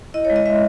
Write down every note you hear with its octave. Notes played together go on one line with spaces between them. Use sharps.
E4 D#5
C#5
G#3
D#5
G#3 E5